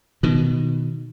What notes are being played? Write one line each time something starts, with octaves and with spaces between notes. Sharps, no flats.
B2 D#3